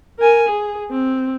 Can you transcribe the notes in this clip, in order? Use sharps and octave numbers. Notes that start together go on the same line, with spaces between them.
A#4 G#5
G#4
C4